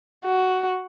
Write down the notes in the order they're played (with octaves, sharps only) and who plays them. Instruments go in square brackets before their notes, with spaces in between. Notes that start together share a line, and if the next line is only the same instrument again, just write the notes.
[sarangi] F#4